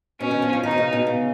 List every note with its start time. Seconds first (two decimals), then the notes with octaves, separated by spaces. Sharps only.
0.21 B2 C#4
0.31 D#3
0.42 F3
0.53 F3
0.63 D#3 D#4
0.71 B2
0.78 C#3
0.93 B2
1.07 C#3